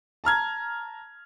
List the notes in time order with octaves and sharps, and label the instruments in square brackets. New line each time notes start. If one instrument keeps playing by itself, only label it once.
[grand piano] A5 A#5 F6 G#6